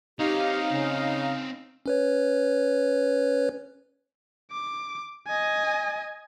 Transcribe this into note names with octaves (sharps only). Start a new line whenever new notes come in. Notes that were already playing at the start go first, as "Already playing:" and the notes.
C4 D#4 G4 C#5 F5
C#3
C#4 B4 C#5
D6
D#5 G#5